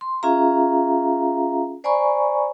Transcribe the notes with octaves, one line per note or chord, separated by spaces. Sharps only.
C6
C#4 F4 G#4 E5 F5 A#5
C5 D5 G#5 A#5 B5 C#6